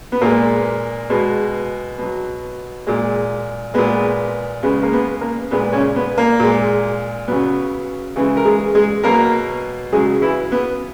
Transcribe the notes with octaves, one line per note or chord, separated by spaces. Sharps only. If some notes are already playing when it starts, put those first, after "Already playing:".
B3
A#2 G#3 A#3
B2 G#3
B2 F#3
A#2 G#3
A#2 G#3 B3
C#3 G#3 B3
A#3
B3
A#3
A#2 G#3 B3
C#3 C#4
B3
A#3
A#2 G#3
C#3 F#3 B3
C#3 E3 G#3
A#4
G#3 G#4
G#3 G#4
B2 F#3 A#3 A#4
C#3 F#3 G#3 G#4
E3 E4
B3